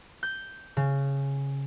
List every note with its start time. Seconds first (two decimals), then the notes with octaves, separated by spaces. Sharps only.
0.23 G6
0.77 C#3